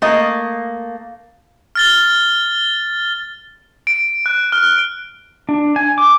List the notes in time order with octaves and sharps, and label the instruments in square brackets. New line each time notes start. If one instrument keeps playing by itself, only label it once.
[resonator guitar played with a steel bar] A3 A#3 D#5
[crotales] F6 A6 G7
D7
F#6
F6
[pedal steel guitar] D4
G#5
D6